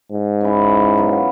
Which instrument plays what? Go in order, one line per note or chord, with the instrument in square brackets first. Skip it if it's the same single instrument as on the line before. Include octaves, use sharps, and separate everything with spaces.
[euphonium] G#2
[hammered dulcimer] C#4 E4
F#3 B3 F4